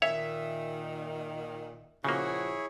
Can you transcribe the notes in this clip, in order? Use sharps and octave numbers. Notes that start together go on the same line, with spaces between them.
A#2 D#3 C#5 E5
A#2 C#3 F3 A#3 E4 F#4 G#4 C#5